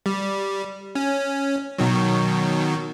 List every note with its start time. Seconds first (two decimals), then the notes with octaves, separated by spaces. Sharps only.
0.06 G3
0.95 C#4
1.78 B2 D#3 F#3